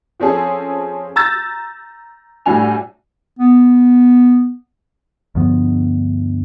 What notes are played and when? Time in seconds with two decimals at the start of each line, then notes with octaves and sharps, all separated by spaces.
0.20 F3 C4 C#4 G#4 A4
1.16 A#5 E6 G6 A6 A#6
2.46 A2 G3 D4 F#4 G#5 F7
3.39 B3
5.35 D2 G2 F3 B3